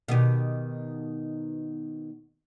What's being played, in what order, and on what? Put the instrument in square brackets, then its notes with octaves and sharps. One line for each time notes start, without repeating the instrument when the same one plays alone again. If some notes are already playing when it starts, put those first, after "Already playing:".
[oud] B2 D#3 G4